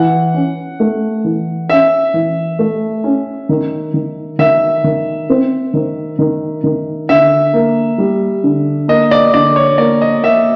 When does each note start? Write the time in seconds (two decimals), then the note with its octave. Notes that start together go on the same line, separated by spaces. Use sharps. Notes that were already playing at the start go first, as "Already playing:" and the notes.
Already playing: E3 F#5
0.34 C#4
0.80 A3
1.24 E3
1.69 C#4 E5
2.14 E3
2.59 A3
3.04 C#4
3.49 D#3
3.94 D#3
4.39 D#3 E5
4.84 D#3
5.30 C4
5.74 D#3
6.19 D#3
6.64 D#3
7.09 D3 E5
7.53 A#3
7.98 G3
8.44 D3
8.88 A#3 D#5
9.11 D5
9.34 D3 D5
9.56 C#5
9.78 A#3 D5
10.01 D#5
10.23 A#3 E5